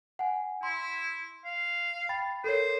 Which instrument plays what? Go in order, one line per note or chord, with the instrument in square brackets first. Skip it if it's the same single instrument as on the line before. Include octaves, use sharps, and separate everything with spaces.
[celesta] F#5 G#5
[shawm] E4 [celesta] C6
[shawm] F5
[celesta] G5 B5 A6
[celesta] A4 A#4 C#5 [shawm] C5